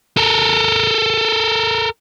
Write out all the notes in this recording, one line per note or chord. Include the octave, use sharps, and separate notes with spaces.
A4 A#4